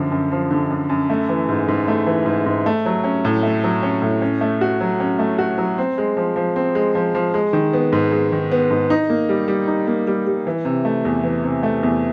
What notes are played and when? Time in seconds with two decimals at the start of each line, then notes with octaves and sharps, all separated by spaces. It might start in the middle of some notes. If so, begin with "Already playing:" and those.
Already playing: F#2 D3 F3
0.11 F#2
0.32 F3
0.51 D3
0.70 F#2
0.89 F#2
1.10 A3
1.29 E3
1.49 G#2
1.68 G#2
1.88 A3
2.06 E3
2.26 G#2
2.46 G#2
2.66 A3
2.86 F#3
3.04 C#4
3.25 A2
3.43 A3
3.64 F#3
3.83 C#4
4.02 A2
4.22 C#4
4.41 A3
4.61 F#4
4.81 F#3
5.00 C#4
5.19 A3
5.38 F#4
5.58 F#3
5.78 C4
5.98 G#3
6.17 F3
6.36 F3
6.56 C4
6.75 G#3
6.95 F3
7.15 F3
7.34 G#3
7.53 D#3
7.73 B3
7.92 G#2
8.12 G#3
8.32 D#3
8.52 B3
8.71 G#2
8.90 D#4
9.10 A#3
9.29 G3
9.48 G3
9.68 D#4
9.87 A#3
10.07 G3
10.27 G3
10.47 E3
10.65 C3
10.85 A3
11.05 E2
11.24 E3
11.44 C3
11.63 A3
11.83 E2